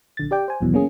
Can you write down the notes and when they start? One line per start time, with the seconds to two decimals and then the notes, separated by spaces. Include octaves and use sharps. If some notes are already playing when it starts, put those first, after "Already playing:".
0.17 A#1 D3 A6
0.31 G4 D5 G5
0.48 C5 G#5
0.61 G1 D#2 B2 E3 F#3
0.74 A#3 C#4 G#4